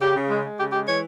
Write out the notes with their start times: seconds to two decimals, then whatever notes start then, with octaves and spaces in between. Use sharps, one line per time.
0.01 C#3 G4
0.15 C#3
0.30 G#3
0.43 G#3
0.58 C#3 G4
0.72 G#3 G4
0.86 E3 C#5